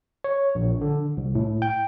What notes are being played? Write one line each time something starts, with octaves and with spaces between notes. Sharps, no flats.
C#5
A#1
D3
C2
A2
G5